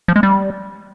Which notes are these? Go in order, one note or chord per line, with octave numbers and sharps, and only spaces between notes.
F3
G#3
G3